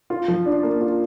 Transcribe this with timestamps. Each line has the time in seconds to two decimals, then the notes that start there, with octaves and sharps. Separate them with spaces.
0.10 F4
0.28 F3
0.46 D4
0.63 A#3
0.81 F4